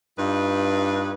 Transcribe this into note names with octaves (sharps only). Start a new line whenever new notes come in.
G2 D#4 F4 B4